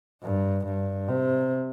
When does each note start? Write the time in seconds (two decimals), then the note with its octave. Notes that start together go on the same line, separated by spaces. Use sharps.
0.23 G2
0.65 G2
1.08 C3